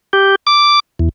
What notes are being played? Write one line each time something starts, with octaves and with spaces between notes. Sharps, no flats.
G4
D6
E2